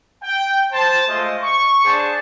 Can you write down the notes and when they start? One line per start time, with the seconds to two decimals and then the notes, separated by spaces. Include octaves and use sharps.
0.23 G5
0.73 C5 A5
1.08 G#3 A3 F4 C5 D#5
1.43 C#6
1.84 D4 G#4 C5 F#5 A5